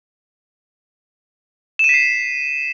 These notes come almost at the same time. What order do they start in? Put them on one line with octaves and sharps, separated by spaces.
E7 D#7 B6 C7